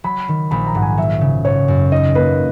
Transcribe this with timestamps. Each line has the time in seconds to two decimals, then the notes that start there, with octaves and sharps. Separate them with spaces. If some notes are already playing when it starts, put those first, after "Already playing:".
0.04 F#3 B5
0.28 D#3
0.51 A#1 B5
0.67 A#5
0.75 G#2 F#5
0.82 G#5
0.98 F#3 E5
1.21 C#3
1.45 G#1 C#5
1.68 F#2
1.92 D#4 D#5
2.15 A#3 B4